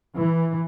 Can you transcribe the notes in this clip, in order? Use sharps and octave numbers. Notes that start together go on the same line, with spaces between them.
E3